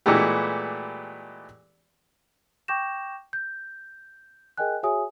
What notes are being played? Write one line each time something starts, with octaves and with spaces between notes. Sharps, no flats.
A#2 E3 G#3 A3 B3 G4
G5 C#6 D6 G6 A#6 E7
G6
G#4 A#4 D#5 G5 G#5 F#6
F#4 G#4 C#5 E5 G#5 D#6